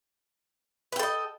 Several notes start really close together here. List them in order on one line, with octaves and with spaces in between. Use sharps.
B4 G5 A4 D#5